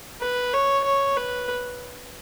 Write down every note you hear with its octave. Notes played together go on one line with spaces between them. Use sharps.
B4
C#5
C#5
B4